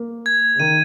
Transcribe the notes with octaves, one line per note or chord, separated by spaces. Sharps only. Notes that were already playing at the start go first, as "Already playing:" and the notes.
Already playing: A#3
G#6
C#3
D#3 D#7